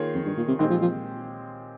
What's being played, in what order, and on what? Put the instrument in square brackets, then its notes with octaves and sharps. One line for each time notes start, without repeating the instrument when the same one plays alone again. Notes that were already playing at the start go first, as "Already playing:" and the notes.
Already playing: [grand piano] D#3 A#3 F4 G#4 C#5
[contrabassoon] F2
G2
A#2
C3
[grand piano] A#2 G#3 C4 G4 C5 [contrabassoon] D#3
[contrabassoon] F3
F3